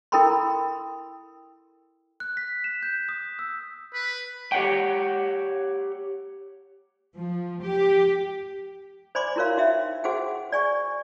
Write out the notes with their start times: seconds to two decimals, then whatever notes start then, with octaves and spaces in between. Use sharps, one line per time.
0.12 E4 A4 A#4 G5 B5 C6
2.20 F#6
2.37 B6
2.64 E7
2.83 G6
3.09 D#6
3.39 E6
3.94 B4
4.52 G4 C#5 F#5 G5
7.17 F3
7.63 G4
9.15 C5 D5 G#5 B5 C6 D6
9.36 E4 F#4 A#4 C#5 F5
9.57 D#4 F#4 E5 G5
10.04 F#4 G#4 C5 F#5 G5
10.52 D5 G#5 C#6